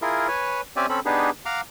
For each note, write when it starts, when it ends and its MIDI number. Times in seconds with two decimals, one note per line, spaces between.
0.02 0.28 64
0.02 0.28 65
0.02 0.28 68
0.02 0.28 70
0.28 0.61 71
0.28 0.61 73
0.28 0.61 80
0.76 0.86 60
0.76 0.86 61
0.76 0.86 67
0.76 0.86 74
0.76 0.86 76
0.76 0.86 80
0.89 1.00 60
0.89 1.00 61
0.89 1.00 69
0.89 1.00 83
1.06 1.30 59
1.06 1.30 62
1.06 1.30 63
1.06 1.30 67
1.06 1.30 68
1.06 1.30 71
1.46 1.61 77
1.46 1.61 78
1.46 1.61 82
1.46 1.61 86
1.46 1.61 89